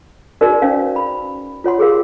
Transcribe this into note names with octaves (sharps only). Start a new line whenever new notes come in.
D#4 F#4 G#4 A#4 B4 D5
C#4 D#4 C5 F5
B5
F4 C#5 F#5 C6
G4 G#4 A#4 F5